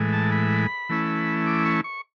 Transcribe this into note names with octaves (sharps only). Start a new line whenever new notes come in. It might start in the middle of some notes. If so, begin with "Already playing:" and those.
Already playing: A2 E3 G#3
A5
B5
E3 A3 C#4 E4
D6
C#6
C#6